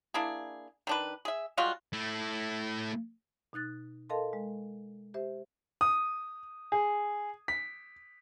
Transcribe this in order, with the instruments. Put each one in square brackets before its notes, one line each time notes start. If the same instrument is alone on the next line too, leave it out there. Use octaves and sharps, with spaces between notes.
[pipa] A#3 D4 E4 G#4
D#3 D4 B4
G#4 E5
G3 G#3 F4 F#4
[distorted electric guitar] A3 E4
[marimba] B2 D#4 F#6 A6
A4 A#4 D#5 F5 A5 C6
G#3
G4 C5 E5
[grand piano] D#6
G#4
B6